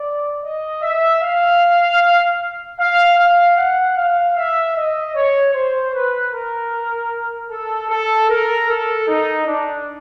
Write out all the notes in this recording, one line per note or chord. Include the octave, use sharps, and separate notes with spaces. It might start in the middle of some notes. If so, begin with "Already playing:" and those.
Already playing: D5
D#5
E5
F5
F5
F5
F#5
F5
E5
D#5
C#5
C5
B4
A#4
A4
A4
A#4
A4
D#4
D4